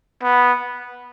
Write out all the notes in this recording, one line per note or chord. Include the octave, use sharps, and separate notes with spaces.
B3